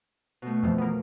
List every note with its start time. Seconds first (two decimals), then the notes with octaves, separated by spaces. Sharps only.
0.42 B2 A3
0.63 F2 E3 F3
0.78 A#3 B3